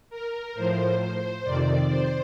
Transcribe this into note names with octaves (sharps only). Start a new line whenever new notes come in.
A#4
A2 F3 C5
F2 C3 D#3 D5
C5